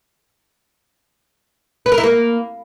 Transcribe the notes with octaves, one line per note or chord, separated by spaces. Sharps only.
B4
A#4
E4
A#3